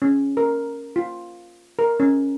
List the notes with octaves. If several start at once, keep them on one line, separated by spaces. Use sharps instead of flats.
C#4
A#4
F4
A#4
C#4